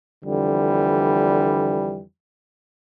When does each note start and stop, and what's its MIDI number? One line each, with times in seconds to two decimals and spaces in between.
0.25 2.02 41
0.25 2.02 50
0.25 2.02 52
0.25 2.02 55